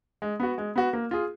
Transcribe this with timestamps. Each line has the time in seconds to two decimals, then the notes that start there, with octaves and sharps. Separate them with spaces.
0.22 G#3
0.40 B3 F#4
0.58 G#3
0.76 B3 F#4
0.93 A#3
1.11 F4 G#4